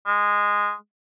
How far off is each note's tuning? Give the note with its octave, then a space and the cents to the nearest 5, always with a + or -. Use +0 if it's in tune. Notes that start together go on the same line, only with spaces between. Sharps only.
G#3 -10